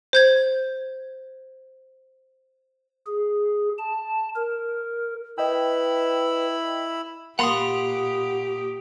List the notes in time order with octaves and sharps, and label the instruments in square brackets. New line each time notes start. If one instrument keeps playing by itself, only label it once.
[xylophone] C5 G6 G#6
[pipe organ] G#4
A5
A#4
[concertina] E4 B5 E6 [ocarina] B4 [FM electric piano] D#5 G5
[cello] A#2 G4 [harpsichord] A#3 [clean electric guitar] F#5 B5 C6 [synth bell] D#6 F7